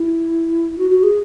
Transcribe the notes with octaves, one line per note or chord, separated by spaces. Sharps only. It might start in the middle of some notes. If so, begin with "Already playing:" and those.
Already playing: E4
F#4
F#4
G#4